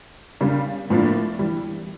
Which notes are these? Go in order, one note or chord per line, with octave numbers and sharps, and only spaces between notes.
C#3 G3 D4
A2 F3 A#3 D4
E3 G3